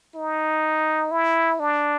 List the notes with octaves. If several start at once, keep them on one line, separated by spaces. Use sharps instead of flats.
D#4
E4
D4